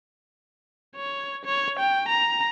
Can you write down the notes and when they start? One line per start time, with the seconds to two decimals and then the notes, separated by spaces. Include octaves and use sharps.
0.96 C#5
1.45 C#5
1.79 G5
2.09 A#5